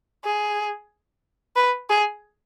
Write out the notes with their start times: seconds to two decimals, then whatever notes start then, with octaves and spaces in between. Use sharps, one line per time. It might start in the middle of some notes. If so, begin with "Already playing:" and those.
0.24 G#4
1.56 B4
1.89 G#4